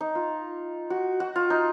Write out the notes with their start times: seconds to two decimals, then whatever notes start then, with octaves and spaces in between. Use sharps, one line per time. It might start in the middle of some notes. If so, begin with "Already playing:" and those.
0.01 D#4
0.15 F4
0.90 F#4
1.20 F#4
1.36 F4
1.50 D#4